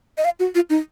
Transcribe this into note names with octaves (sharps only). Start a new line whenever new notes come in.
D#5
F5
F#4
F4
D#4